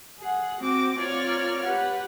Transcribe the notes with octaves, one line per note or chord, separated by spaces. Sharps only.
G#4 F#5
C4 F#4 D6 A#6
C4 F4 A#4 C#5 D5 F6
G4 B4 F#5